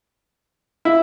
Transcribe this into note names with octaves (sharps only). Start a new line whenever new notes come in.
E4